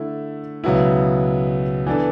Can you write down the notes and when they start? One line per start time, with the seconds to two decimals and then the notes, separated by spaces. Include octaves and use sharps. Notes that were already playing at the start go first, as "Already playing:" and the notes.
Already playing: D3 A3 E4
0.64 C#2 B2 F#3 B3 E4
1.86 E3 B3 D4 A4